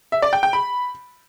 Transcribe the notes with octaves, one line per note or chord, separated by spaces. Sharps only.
E5
D5
G5
G5
B5